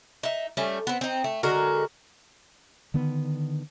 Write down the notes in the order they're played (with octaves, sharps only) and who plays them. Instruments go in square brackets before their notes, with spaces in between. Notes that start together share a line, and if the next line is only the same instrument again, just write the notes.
[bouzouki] D#4 E5
G3 A3 C#4
B3 C4
C4 D#4
A3
D3 G#3 F#4 A#4
[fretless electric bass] D3 D#3 B3